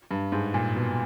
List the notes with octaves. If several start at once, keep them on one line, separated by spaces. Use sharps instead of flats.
G2
G#2
A#2
B2